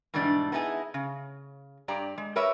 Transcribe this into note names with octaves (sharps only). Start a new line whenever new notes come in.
G#2 B2 E3 G3 D4
B3 D#4 E4 G4 G#4
C#3
G2 G4 D5 A#5
G#3
G4 A#4 B4 C#5 E5